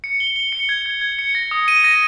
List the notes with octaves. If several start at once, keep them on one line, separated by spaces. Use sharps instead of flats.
C#7
G7
G7
C#7
G#6
G#6
G#6
C#7
A#6
D#6
D#7
A#6